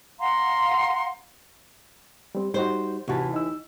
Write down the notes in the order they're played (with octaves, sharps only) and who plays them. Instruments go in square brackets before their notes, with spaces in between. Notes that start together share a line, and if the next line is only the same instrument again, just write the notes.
[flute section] F5 F#5 A#5 C6
[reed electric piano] G3 C4
[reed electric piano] G3 D#4 F#4 [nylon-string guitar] C5
[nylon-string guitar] D#2 E3 [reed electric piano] C3 F#4 A5
[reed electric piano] D#4 E6